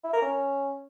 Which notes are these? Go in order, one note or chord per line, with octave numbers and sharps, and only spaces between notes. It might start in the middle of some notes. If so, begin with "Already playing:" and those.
E4
A#4
C#4